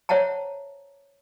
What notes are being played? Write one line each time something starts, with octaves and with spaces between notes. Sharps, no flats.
C5 C#5 E5 F#5 A5 A#5